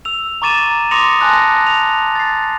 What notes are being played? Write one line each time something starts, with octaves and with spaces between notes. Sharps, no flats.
E6 F7
A#5 C#6 D6 A6 D#7 E7
C6 D6 D#6 A#6 C#7 F7
G#5 A5 C6 F#6 A#6
F7
A6 C7